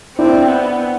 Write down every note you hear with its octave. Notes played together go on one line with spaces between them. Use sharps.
C4 D4 E4
B3